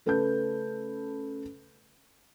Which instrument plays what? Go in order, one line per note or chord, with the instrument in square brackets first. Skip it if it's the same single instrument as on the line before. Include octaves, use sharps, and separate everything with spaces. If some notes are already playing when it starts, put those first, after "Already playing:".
[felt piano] C#3 A3 A4 B4 A5 G6